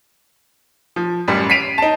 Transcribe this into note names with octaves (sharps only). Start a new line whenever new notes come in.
F3
A1 F#2 G3
B6 C7 D7 D#7 F7
D#4 A5